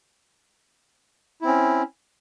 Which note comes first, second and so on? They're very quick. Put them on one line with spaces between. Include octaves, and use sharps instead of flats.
E4 C4 C#4